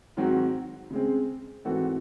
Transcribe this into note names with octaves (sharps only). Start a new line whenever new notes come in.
G#2 D#3 F#3 C4 F#4
C#3 G#3 C4
G#2 E3 C4 F#4 A4